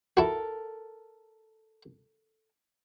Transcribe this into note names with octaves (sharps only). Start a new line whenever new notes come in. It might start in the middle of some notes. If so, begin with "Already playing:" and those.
E4 F#4 A4 A#4